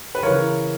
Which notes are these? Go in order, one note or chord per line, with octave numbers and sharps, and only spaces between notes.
B4
C#3 E3 A#4 C#5